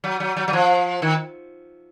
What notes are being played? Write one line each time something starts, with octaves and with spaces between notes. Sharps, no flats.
F#3
F#3
F#3
F#3
F3
D#3